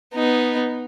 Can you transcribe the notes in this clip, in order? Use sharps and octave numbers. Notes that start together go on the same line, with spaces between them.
B3 D#4